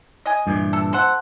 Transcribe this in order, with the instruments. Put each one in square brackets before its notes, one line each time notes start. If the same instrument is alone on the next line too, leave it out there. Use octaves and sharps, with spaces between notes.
[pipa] D#5 G#5
[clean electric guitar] G2 A#2 E3
[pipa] A4
A4 C5 F#5